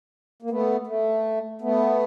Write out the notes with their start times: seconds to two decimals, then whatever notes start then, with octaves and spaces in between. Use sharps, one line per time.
0.43 A#3
0.50 A3 B3
0.87 A3
1.61 A3 B3